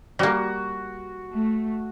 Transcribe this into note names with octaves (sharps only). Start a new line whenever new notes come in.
G3 A#3 F#4
A3